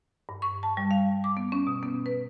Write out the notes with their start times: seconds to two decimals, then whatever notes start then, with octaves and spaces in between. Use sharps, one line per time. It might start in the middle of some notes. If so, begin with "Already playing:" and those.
0.29 G2
0.42 C#6
0.63 A5
0.77 G3
0.91 F5
1.24 D6
1.37 B3
1.52 C#4
1.67 B2
1.83 B3
2.06 B4